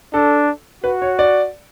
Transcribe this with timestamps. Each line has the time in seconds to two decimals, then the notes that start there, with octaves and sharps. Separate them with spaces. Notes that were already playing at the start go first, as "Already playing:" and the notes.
0.14 D4 A4
0.84 F#4 B4
1.02 C#5
1.19 D5